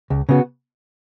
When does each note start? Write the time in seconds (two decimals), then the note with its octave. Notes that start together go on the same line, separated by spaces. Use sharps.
0.10 C#2
0.29 C#3 B3 F#4